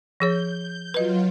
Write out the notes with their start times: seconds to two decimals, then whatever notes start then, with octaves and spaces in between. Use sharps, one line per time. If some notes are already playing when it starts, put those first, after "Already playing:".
0.20 F3 G#4 C#5 G6
0.94 F#3 F4 B4 D#5